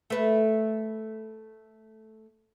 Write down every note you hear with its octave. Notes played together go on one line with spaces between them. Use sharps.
A3 B4